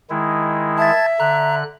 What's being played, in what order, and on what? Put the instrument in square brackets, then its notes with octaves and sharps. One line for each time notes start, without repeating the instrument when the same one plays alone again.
[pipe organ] D#3 G#3 E4
[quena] E5 [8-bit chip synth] A5 G#6 A6
[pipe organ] D3 F#6 [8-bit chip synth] A#5